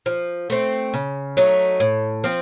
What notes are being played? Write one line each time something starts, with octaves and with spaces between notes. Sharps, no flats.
F3
A3 C4
C#3
F#3 A3 D#4
A2
F3 C4